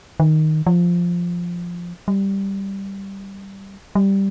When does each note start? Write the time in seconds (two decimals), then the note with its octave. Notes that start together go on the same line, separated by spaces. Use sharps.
0.20 D#3
0.67 F3
2.08 G3
3.95 G3